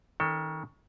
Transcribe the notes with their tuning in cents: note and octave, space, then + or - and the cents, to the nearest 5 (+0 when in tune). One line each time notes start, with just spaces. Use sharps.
D#3 +30 C#4 +0 A4 +25